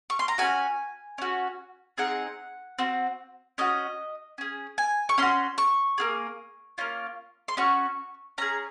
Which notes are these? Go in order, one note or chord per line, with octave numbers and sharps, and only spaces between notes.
C#6
C6
A#5
C#4 F#4 G#5
C#4 F#4
C4 D#4 G#4 F#5
C4 F#4
C#4 F#4 D#5
C#4 G#4
G#5
C#6
C#4 F#4 C6
C#6
A#3 F4 G#4
A#3 C#4 F4
C6
C#4 F#4 C#6
C#4 G#4 A#5